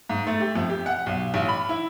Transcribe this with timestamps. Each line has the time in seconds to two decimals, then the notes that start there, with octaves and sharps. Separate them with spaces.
0.09 G#2
0.27 A3
0.41 G4
0.55 F2
0.70 G4
0.86 F#5
1.06 B1
1.34 A1
1.49 B5
1.69 E4